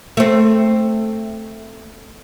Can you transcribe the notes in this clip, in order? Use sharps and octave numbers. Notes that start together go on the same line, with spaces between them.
A3 C4